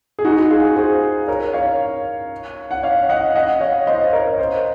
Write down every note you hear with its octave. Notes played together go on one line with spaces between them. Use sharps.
G#4
D#4 F#4
F4 G#4
G#4 C5
A#4 C#5
C#5 F5
F#5
C#5 F5
D#5 F#5
D#5 F#5
C#5 F5
C5 D#5
F5
D#5
A#4 C#5
C5 D#5